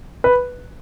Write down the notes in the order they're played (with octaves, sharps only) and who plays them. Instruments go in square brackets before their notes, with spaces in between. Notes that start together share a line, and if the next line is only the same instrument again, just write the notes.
[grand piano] B4